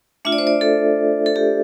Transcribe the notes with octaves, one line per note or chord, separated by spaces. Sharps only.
A3 D4 F4 E5
D5
C5
D5
A4
A4
G4